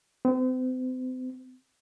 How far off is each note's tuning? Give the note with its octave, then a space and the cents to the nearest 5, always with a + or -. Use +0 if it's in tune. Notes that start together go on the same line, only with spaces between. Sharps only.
C4 -40